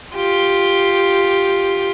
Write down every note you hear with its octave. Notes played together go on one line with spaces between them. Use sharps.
F4 G4